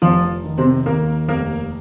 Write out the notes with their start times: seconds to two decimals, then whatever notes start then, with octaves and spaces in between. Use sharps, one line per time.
0.02 F1 F3 F4
0.44 D#3
0.58 C3 C4
0.86 D#2 A#3 A#4
1.28 F1 A#3 A#4